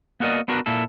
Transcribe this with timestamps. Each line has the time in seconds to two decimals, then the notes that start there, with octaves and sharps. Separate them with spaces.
0.20 A#3 B3 F#4 A#4 D5 D#5
0.48 B3 D4 F#4 A#4 B4
0.66 A#2 A#3 E4 A4